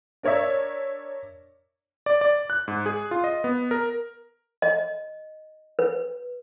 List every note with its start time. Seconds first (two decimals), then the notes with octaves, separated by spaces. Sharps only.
0.23 D4 A#4 C#5 D5 E5
2.06 D5
2.21 D5
2.50 F#6
2.68 G#2
2.86 G#4
3.11 F4
3.24 D#5
3.44 B3
3.71 A#4
4.62 D#5
5.79 B4